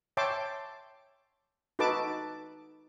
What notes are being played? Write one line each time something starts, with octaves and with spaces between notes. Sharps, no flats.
C#5 E5 G5 A5 C6 D6
D#4 F#4 A4 B4 A5 D6